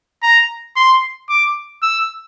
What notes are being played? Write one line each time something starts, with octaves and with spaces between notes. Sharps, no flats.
A#5
C6
D6
E6